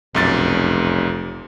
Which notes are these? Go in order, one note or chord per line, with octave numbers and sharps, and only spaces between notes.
F1 B1 F#2 A6